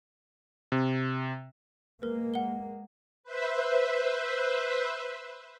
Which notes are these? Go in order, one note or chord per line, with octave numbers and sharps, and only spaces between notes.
C3
G#3 A#3 A#4 B4
F#5 G7
B4 C5 E5